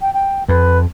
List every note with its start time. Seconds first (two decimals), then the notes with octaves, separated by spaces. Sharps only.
0.01 G5
0.14 G5
0.48 F2 B4